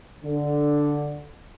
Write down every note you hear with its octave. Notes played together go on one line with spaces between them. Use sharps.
D3